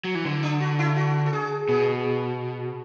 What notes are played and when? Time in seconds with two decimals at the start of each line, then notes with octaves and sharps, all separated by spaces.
0.05 F#3
0.15 E3
0.25 D3
0.43 D4
0.60 F#4
0.79 E4
0.96 F#4
1.26 A4
1.33 G#4
1.69 B2 G#4